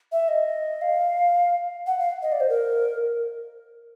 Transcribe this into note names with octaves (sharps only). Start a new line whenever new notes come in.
E5
D#5
F5
F#5
F5
D#5
D5
C5
A#4